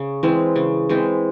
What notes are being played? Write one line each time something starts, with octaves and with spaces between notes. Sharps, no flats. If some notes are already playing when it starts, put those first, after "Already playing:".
Already playing: C#3
E3 G#3 C4
C#3
E3 G#3 C4